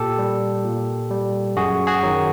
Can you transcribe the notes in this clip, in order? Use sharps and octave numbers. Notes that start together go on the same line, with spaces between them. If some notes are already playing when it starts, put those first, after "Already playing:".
Already playing: A#2 G4 A4
G3
A#2
G3
F#2 F#4 G#4
F#4 G#4
D#3 F#3